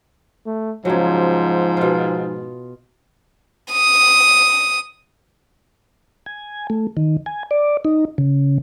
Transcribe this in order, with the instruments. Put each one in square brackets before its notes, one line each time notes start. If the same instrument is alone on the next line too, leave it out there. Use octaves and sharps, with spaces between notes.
[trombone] A3
[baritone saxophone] G#2 [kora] C#3 F#3 [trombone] F3
[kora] B2 F4
[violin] D#6
[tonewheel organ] G#5
A3
D#3
G#5
D5
D#4
C#3